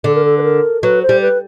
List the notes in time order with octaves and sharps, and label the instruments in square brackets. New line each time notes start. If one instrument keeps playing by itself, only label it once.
[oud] D3 [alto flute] A4
[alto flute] A#4
A4
B4
A#4
[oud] F#3 [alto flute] B4
[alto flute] C5
[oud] G3
[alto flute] B4